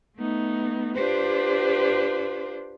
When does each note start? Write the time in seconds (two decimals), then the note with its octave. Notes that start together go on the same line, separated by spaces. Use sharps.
0.16 A3 B3 D#4
0.95 D4 F4 G4 B4 C5